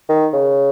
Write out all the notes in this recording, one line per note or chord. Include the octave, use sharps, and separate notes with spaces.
D#3
C#3